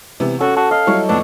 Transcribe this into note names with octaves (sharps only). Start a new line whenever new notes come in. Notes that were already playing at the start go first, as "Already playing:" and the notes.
C3 E3 B3
C#4 F#4 A4
F#4 A5
D#5 F5
F#3 G3 E4 C#5
F2 A2 B3 D4